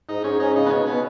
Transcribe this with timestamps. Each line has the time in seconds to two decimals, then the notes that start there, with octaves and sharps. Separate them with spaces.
0.09 G#2 D#4
0.24 G#2 C#4
0.39 C#4 D#4
0.55 C#3 D#4
0.66 B3
0.70 B2 C#4
0.86 B2 B3